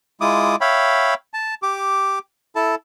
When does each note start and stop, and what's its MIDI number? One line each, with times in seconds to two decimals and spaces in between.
0.21 0.56 56
0.21 0.56 64
0.21 0.56 65
0.21 0.56 86
0.21 0.56 87
0.61 1.14 73
0.61 1.14 76
0.61 1.14 77
0.61 1.14 79
0.61 1.14 83
1.34 1.54 81
1.63 2.19 67
1.63 2.19 86
2.56 2.75 64
2.56 2.75 69
2.56 2.75 81